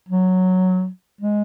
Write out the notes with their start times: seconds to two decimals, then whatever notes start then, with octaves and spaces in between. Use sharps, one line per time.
0.08 F#3
1.21 G#3